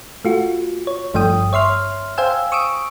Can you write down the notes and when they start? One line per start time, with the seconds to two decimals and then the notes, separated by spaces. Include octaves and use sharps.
0.25 A3 F4 F#4
0.87 C#5
1.14 G1 G2 F3 A3 G5 D#6
1.53 C#5 E5 C6 F6
2.18 C5 F5 G5 G#5 E6
2.52 C#6 D#6 E6 D7